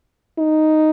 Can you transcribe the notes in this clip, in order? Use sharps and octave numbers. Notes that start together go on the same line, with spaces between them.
D#4